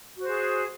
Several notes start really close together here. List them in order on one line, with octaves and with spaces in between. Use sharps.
F#4 C5 G#4